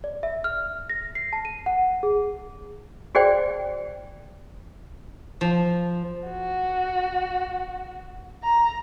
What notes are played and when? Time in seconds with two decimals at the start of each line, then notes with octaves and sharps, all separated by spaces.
0.04 D5
0.23 E5
0.44 F6
0.90 A#6
1.15 C7
1.33 A5
1.45 D#7
1.66 F#5
2.03 G#4
3.15 F#4 G#4 C5 D5 G5
5.41 F3
6.27 F#4
8.43 A#5